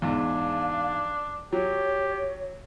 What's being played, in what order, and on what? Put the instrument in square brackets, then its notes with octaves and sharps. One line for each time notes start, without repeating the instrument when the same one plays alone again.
[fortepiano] E2 G#2 [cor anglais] D4 [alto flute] F5
[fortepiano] F#3 [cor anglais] G4 [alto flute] C#5